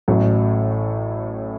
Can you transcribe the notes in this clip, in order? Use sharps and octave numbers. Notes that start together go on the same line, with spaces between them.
A1 A2 F#3